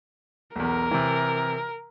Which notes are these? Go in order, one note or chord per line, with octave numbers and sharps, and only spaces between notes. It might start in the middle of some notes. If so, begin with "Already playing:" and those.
B1 E2 A#4
C3 E3